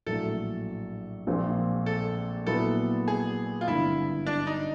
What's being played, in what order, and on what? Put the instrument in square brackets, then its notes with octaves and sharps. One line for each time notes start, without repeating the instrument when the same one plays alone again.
[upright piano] A#1 A2 F#3 A3 [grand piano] A4
[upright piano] A#1 A#2 F3 G#3 C4
[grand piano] A4
[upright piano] A#2 F#3 B3 E4 [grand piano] A4
[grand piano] G#4
F4
[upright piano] G#1 G2 D3 [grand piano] E4
[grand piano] D4
D#4